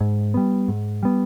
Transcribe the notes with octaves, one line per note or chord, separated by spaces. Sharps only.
G#2
G3 B3
G#2
G3 B3